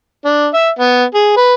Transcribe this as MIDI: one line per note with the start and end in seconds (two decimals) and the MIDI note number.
0.24 0.47 62
0.54 0.69 76
0.79 1.04 59
1.14 1.32 68
1.36 1.54 71